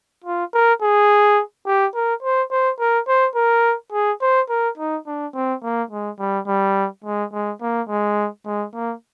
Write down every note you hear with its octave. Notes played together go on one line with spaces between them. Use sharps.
F4
A#4
G#4
G4
A#4
C5
C5
A#4
C5
A#4
G#4
C5
A#4
D#4
D4
C4
A#3
G#3
G3
G3
G#3
G#3
A#3
G#3
G#3
A#3